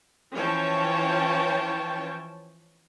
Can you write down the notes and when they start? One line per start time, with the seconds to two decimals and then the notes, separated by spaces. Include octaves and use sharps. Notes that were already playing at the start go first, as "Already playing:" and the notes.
0.34 E3 F3 C#4 C#5 G5 A5